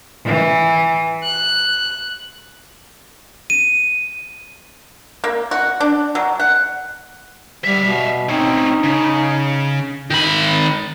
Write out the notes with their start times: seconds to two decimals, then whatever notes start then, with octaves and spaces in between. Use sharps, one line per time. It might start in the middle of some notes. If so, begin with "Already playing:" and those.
0.25 E3
1.24 F#6
3.50 D#7
5.24 A#3
5.51 F#4
5.80 D4
6.15 F#3
6.39 F#5
7.64 G3 E5 F5
7.85 B2
8.29 C4 C#4 D#4
8.84 C#3
10.11 D#3 B5